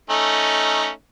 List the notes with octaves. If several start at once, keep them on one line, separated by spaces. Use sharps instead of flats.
A3 C#4 D#4